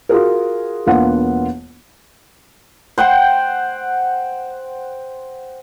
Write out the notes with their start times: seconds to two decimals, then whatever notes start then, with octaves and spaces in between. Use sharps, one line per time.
0.09 F4 F#4 G#4 A#4
0.86 E1 A#3 B3 D4 F4 F#5
2.98 C5 F#5 G5 C6